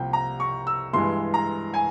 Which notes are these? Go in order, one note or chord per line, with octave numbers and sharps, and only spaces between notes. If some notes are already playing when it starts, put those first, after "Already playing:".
Already playing: C2 C3 F3 A#3 G5
A#5
C#6
E6
G2 E3 G#3 C6
A#5
G#5